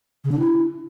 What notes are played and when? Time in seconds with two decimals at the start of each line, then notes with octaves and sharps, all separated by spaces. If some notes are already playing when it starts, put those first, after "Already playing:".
0.24 C#3
0.32 D4
0.39 E4